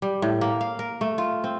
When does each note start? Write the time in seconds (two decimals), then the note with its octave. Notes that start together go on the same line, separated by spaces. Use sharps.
0.02 G3
0.22 A2
0.41 A#3
0.61 F5
0.79 A#4
1.01 A3
1.18 F4
1.44 C4